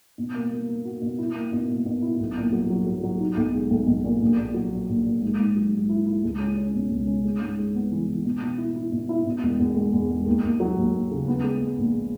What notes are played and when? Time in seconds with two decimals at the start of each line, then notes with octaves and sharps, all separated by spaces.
0.18 B2
0.35 A#3
0.52 A#3
0.68 A#3
0.85 F#4
1.02 B2
1.18 E4
1.36 A#3
1.52 B2
1.69 A#3
1.86 B2
2.02 E4
2.20 B1
2.37 A#2
2.53 F#3
2.70 F#3
2.87 F#3
3.03 F#3
3.20 D#4
3.37 B1
3.54 G#3
3.71 B1
3.87 B1
4.04 A#2
4.22 A#1
4.38 A#2
4.54 F#3
4.72 A#2
4.89 A#1
5.06 A#2
5.22 G#2
5.39 G#2
5.56 F#3
5.72 G#2
5.89 E4
6.06 E4
6.24 C#2
6.40 C#4
6.57 C#4
6.74 B2
6.90 C#2
7.07 C#4
7.24 G#3
7.40 G#2
7.58 G#3
7.75 B3
7.92 E3
8.08 E3
8.25 B2
8.41 B2
8.58 E4
8.76 E4
8.92 B2
9.09 E4
9.26 B2
9.43 E1
9.59 E2
9.76 G#3
9.92 E2
10.10 G#3
10.26 D#2
10.43 D#2
10.60 F#3
10.77 D#2
10.93 D#2
11.11 C#3
11.28 B3
11.44 G#3
11.61 G#3
11.78 A#1